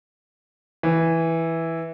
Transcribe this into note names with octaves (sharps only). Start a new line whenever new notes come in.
E3